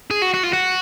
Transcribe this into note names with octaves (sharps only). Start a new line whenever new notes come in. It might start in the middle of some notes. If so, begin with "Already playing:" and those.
G#4
F#4
F#4
F4
F#4